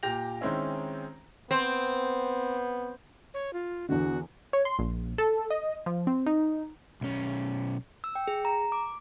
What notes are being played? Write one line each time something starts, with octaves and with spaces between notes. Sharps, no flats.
A#2 G4 A#6 F7
D#3 G#3 C4 C#4 E4
B3 C4
C#5
F4
E2 D3 F#4
C#5
C6
A#1
A4
D#5
F3
C4
D#4
B1 C#4
E6
G5
G#4
A#5
D6